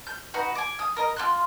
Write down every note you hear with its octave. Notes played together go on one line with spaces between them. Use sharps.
G6
D#4 F#4 B4
G#5 D6
D#6
A#4 D#5
F4 G4 C6 F#6